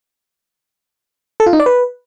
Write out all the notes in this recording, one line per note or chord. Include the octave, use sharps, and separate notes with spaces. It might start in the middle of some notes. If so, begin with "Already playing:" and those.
A4
F4
D#4
D5
B4